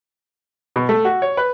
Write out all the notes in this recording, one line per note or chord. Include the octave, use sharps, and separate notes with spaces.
B2
A3
F#4
C#5
B4